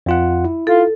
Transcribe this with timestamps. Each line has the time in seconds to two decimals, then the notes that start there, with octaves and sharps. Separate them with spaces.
0.06 F2 F4 F#5
0.45 E4
0.67 F4 A4